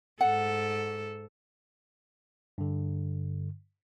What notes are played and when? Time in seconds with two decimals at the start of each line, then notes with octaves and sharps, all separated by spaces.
0.21 G#2 A4 F#5
2.58 G2 D3